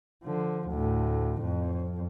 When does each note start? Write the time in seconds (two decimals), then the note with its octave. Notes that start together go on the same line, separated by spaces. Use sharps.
0.24 D3 F3
0.69 D2 A2
1.42 F2